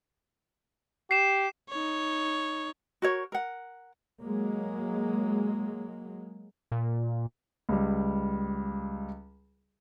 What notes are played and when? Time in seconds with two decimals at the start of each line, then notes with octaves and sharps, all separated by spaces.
1.11 G4 C7 E7
1.70 D#4 C#5
3.02 F#4 A#4 C#5
3.32 A#4 F#5
4.22 F#3 G#3 A#3
6.72 A#2
7.69 C#2 G3